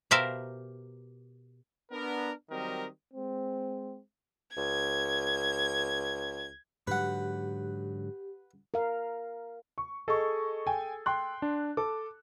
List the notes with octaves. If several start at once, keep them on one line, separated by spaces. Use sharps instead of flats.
B2 G4 A#4 C5 E5 F5
B3 D4 A#4
D#3 F#3 G3 C4 A#4 D#5
G#3 C4
C#2 G#6
G#2 D3 F#3 G4 B4 F#5
A#4 F5
C#6
G#4 A4 D#5 C#6
G5 G#5
G5 C6 F#6
D4
A4 D6